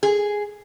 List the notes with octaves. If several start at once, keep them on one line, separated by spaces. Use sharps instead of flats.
G#4